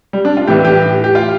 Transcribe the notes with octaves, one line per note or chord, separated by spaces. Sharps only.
G3
D4
F4
A2 E3 G4
G4
G4
F4